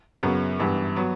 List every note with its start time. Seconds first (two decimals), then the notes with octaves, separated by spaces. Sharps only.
0.23 F#2 C#3 F#3 B3
0.60 G2 E3 B3
0.96 F#3 B3